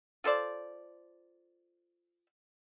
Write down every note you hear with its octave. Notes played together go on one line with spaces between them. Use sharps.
F4 A4 C5 D5